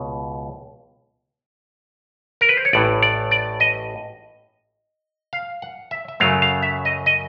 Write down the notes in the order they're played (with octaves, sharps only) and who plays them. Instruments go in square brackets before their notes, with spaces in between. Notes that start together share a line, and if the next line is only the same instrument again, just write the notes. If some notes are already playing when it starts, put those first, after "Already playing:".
Already playing: [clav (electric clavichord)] C#2 B2
A#4
B4
C5
C#5
A1 A2 E3 D5
D5
D5
D#5
F5
F#5
E5
E5
F#2 C#3 F#3 A3 F5
F5
E5
D#5
D#5